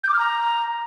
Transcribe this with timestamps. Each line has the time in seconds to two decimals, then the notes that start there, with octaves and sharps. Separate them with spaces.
0.04 G6
0.09 D6
0.14 F6
0.19 A#5